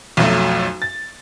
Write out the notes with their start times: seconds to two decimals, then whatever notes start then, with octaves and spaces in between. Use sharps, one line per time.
0.17 B1 F2 F#3 A3
0.82 A6